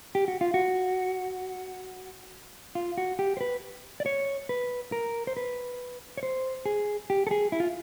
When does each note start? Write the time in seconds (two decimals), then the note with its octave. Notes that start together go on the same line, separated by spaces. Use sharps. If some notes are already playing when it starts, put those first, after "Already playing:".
0.15 G4
0.28 F#4
0.41 F4
0.54 F#4
2.75 F4
2.98 F#4
3.19 G4
3.37 C5
3.41 B4
4.00 D5
4.06 C#5
4.49 B4
4.92 A#4
5.27 C5
5.37 B4
6.17 C#5
6.23 C5
6.66 G#4
7.10 G4
7.27 A4
7.31 G#4
7.52 E4
7.60 F4